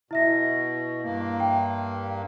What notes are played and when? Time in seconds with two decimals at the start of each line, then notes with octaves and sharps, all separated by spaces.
0.11 B2 E4 E5 A#6
1.03 G2 A#3
1.40 G5